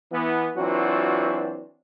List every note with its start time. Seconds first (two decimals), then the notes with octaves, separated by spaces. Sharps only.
0.12 E3 B3
0.56 E3 F#3 C4 D4 F4 F#4